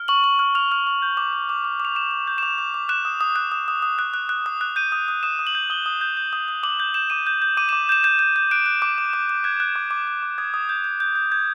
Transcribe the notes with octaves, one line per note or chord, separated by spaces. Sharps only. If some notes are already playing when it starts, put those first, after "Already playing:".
Already playing: F6
C#6 F#7
C#6
F6
F6 F7
F6
C#6
G6
D6
D6
D6
D6
D6
F7
D6 E7
D6
G6
E7
D6 F7
D6
D6
F#6 E7
D#6
D#6
F#6
D#6
D#6
D#6
F#6
F#6
F#6
D#6
F#6
G6 D#7
D#6
D#6
D#6 E7
D#6
F#7
G6
D#6 G7
D#6
G6
G6
D#6
D#6
D6 F#7
G6
G6 E7
D6 D#7
G6
G6
D6 D#7
E7
D6
G6 E7
G6 E7
G6
G6
F#6 D7
F#6
D6
D6
D6
D6
F#6 G#6
F#6
D6
D6
D6
D6
D#6 G#6
D#6
G6
G6
G6
G6
G6 G#6